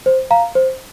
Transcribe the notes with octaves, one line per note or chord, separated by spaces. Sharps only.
C5
F5 A#5
C5